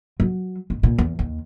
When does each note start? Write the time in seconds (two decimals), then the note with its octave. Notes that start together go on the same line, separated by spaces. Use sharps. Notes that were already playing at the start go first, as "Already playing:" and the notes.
0.20 F#3
0.70 G#2
0.83 A#2
0.98 E2
1.19 D#2